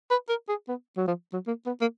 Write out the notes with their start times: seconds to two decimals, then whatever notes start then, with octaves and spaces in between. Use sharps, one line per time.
0.11 B4
0.29 A#4
0.49 G#4
0.68 B3
0.97 F#3
1.08 F3
1.33 F#3
1.47 A#3
1.66 B3
1.81 A#3